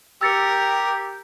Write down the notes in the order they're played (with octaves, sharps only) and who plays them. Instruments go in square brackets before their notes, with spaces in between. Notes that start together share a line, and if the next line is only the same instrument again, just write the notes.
[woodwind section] G4 [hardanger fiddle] A#4 [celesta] E6 A6 C#7